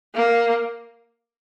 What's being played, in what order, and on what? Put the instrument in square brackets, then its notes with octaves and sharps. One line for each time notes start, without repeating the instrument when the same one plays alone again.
[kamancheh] A#3